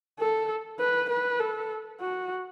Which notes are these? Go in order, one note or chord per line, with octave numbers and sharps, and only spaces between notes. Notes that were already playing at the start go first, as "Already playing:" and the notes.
A4
B4
B4
A4
F#4